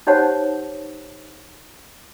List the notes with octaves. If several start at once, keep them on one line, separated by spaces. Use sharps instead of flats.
D#4 G4 C5 C#5 F#5 A5